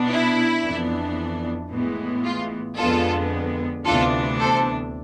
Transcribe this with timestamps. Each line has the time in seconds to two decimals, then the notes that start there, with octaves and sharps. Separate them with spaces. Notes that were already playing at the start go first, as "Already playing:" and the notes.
Already playing: B2 B3 D4
0.10 E4
0.63 F2 E3 B3 D4
1.71 A2 E3 G#3 B3
2.24 F4
2.78 F2 D3 G#3 B3 F4 A4
3.85 D2 C3 E3 B3 D4 F4 A4
4.39 A4 C5